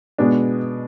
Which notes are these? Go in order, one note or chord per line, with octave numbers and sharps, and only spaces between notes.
B2 G#3 B3 D4